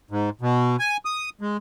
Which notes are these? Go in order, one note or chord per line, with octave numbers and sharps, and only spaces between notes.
G#2
B2
G#5
D#6
G#3